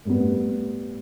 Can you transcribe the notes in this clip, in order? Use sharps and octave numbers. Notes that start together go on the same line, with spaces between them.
A2 G3 B3